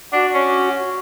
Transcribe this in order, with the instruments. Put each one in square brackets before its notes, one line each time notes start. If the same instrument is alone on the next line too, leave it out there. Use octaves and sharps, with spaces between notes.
[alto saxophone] D4 [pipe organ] F#4
[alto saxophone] C#4